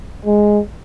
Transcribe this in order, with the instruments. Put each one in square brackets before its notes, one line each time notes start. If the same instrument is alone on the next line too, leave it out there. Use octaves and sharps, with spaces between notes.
[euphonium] G#3